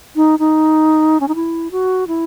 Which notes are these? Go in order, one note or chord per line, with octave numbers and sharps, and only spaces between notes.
D#4
D#4
C#4
D#4
E4
F#4
E4